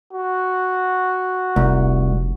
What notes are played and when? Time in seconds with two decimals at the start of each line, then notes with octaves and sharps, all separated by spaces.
0.13 F#4
1.56 F1 C2